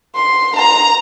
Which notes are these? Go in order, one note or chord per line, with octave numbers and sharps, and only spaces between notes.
C6
A#5